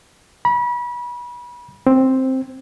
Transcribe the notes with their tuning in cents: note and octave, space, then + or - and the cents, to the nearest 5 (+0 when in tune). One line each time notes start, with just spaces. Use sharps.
B5 -30
C4 +5